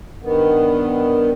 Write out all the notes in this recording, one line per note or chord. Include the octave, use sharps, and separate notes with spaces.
G2 D#3 B3